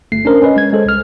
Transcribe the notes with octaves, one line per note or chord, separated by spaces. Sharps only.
G1 A3 C7
C#4 D4 A#4 C5
C#4 B4 D#5
G#3 G#6
G#3 A4 C5
C2 F6